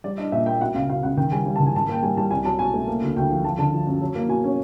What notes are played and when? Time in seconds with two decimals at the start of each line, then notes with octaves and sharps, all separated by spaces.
0.04 G3 D5
0.18 D4 D#5
0.32 A#2 E5
0.46 A#3 G5
0.61 B2 F#5
0.75 C#2 F5
0.90 B2 F5
1.03 C#2 F#5
1.17 D#3 G5
1.32 G3 G#5
1.46 G3
1.56 D#3 A5
1.66 G#5
1.75 G#2 A5
1.88 A#3 G5
2.03 G3 G#5
2.17 G3 A5
2.31 C2 G#5
2.45 F#3 A5
2.59 B2 G#5
2.74 A3
2.87 A#3
3.02 D2
3.17 D2 G5
3.30 F3
3.44 F3 A5
3.58 D3 A5
3.72 F3
3.87 F#2
4.01 F#3
4.15 A#3
4.29 B2 G#5
4.44 C#4